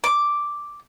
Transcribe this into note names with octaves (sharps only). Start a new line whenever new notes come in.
D6